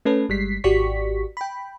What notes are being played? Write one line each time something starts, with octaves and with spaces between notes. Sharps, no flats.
A3 C#4 A4 B4
G1 G3 G#3 B6 C7
G#1 F#4 G4 D5 C#6 B6
G5 B5